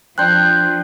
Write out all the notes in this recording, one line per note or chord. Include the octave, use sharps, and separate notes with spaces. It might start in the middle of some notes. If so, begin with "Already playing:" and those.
F3 D4 C5 G5 F#6 G6